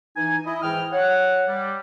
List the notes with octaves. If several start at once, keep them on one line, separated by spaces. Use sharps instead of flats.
E3 D#4 G#5
E4 D#5
G#2 E3 E4 G5 D#6 F6
C#5 F#5
G3